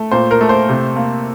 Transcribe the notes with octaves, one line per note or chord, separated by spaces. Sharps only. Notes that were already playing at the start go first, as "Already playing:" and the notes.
Already playing: A3
A#2 C5
A#4
A3
C5
C3
A#3